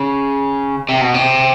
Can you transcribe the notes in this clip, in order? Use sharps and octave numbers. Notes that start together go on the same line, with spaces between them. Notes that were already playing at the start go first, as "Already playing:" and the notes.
Already playing: C#3
C3
B2
C3